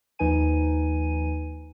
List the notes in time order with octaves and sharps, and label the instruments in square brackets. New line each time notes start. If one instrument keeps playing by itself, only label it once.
[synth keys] D#2 F3 D#4 B4 G#5 D#7